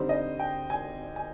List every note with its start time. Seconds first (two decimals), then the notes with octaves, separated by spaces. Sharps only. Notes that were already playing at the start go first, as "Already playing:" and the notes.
Already playing: D3 G3 C4 D#4 C5
0.09 D#5
0.39 G5
0.70 G#5
1.16 G#5